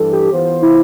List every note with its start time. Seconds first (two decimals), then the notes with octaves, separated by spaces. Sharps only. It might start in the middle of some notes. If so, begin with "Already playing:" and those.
Already playing: G2 E3 G3 D4 A4
0.12 G4
0.33 E3 B3 F4 C5
0.62 E4